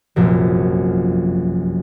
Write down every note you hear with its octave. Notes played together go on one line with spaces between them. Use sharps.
F1 A#1 F#2